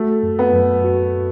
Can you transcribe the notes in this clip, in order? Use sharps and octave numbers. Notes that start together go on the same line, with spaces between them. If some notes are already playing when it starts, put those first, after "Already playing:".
Already playing: A3 F#4
F#2
B3
F#2
F#4